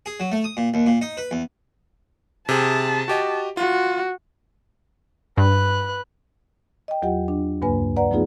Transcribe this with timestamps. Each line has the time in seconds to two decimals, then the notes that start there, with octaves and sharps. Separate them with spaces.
0.06 G#4
0.20 F#3
0.32 A3
0.44 D#6
0.57 A#2
0.74 D#2
0.87 A#2
1.02 D#4
1.17 B4
1.31 E2
2.49 C3 G#4 A5
3.08 F#4 G4 D#5
3.57 F4 F#4
5.38 G2 B4 F#6
6.88 D#5 G5
7.02 E2 F#3 F4 G4 D#5 F#5
7.28 D4
7.62 D2 G2 C#3 A#3 B4 G#5
7.96 B4 D5 F#5 A#5
8.11 F3 A3 B3 D#4 F4 G#4